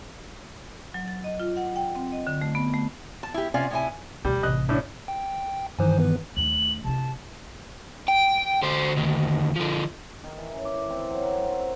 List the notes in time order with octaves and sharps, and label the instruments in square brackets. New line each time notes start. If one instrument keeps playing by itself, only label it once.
[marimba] F#3
A6
D#5
F4
F#5
G5
C4
D#5
D3
A3
B3
A3
[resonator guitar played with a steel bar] A5
E4 G4
C3 C#4 F4 D5 F5
A2 C3 E4 G#5
[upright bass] D2 B2 [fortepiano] G3
[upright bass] A1 C3 [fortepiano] D#5 F#6
[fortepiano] A2 C#4 D4
[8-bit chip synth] G5
[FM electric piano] G2 D#3 E3 [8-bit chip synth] C5 G#5
[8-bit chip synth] B3 B4
[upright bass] D#2 A3 [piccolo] F#7
[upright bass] C3 E4 [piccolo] A5
[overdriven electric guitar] G5
D3 C5
D2 D#3
D3 F3
[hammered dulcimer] D#3
E3
C#4
D6
C4
F#3
A#4
C4